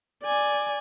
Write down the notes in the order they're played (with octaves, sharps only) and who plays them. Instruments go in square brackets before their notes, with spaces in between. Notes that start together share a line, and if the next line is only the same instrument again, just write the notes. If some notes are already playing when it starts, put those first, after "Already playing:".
[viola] D5 G#5